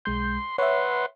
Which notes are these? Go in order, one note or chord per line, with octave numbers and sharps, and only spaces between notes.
B1 G#3 C6 G6
B4 C#5 E5 F#5 C6